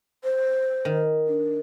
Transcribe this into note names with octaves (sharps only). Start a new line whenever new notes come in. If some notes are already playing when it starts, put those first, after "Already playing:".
C5
D#3
D4